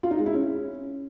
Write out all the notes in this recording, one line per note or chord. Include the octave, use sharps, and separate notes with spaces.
F4
D#4
G#3
E4
C#4